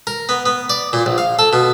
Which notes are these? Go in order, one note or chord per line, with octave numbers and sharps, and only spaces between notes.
A#4
B3
B3
D5
A#2
A#1
F5
A4
B2